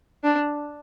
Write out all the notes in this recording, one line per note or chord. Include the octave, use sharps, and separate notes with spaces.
D4